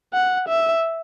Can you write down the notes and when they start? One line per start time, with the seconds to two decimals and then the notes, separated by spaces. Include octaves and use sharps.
0.13 F#5
0.48 E5